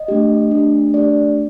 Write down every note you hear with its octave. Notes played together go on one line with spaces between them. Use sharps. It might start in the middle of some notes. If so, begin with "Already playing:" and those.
Already playing: D#5
A3 D4 G4
A3 D4 G4
A3 D4 G4 D5